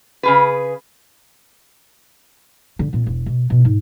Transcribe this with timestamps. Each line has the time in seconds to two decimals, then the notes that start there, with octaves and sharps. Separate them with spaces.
0.23 C#3 G#4 B4
2.79 D3
2.93 A#2 C4
3.07 E1
3.26 B2
3.50 B2
3.65 G#2